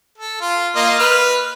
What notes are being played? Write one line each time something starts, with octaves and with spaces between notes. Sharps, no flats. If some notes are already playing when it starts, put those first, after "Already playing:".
A4
F4
A#3 F4 D#5
B4 F6